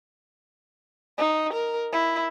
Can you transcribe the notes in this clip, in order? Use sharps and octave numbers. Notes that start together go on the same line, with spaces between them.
D#4
A#4
E4